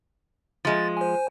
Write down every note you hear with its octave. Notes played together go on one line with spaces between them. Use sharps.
F3 G#3 A6
C5 G#5